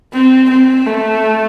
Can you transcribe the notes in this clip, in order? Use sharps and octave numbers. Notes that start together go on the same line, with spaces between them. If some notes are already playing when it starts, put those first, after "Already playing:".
C4
C4
A3